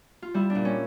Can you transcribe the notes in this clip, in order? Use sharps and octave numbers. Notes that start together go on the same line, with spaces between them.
F4
G3 E4
D4
A#2
C#4